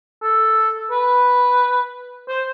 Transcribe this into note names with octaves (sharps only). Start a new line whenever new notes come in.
A4
B4
C5